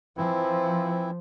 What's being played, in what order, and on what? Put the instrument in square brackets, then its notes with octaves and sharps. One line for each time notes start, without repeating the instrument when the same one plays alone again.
[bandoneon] E3 C4 E4 [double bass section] F3